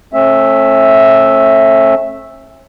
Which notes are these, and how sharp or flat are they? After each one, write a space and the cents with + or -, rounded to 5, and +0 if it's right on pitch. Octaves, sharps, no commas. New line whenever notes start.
A3 +0 C#4 -45 E5 +0